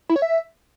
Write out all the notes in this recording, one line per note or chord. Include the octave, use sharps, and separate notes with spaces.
E4
C#5
E5